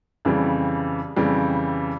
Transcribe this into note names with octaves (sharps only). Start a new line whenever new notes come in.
F2 C#3 E3 G3
F2 C#3 E3 G3